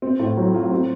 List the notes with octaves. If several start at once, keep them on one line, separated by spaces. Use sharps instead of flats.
C4
A2
F#3
F4
C4